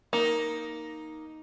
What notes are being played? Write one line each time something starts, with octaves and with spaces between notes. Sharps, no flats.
A#3 D#4